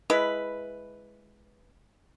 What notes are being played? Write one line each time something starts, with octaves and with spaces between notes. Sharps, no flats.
G#3 E4 B4